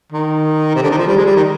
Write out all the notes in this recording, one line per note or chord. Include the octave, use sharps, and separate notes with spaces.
D#3
C3
D3
D#3
F3
G3
G#3
G3
D#3